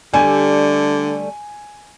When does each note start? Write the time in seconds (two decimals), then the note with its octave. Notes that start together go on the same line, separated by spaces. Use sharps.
0.14 D3 G3 A3 G#5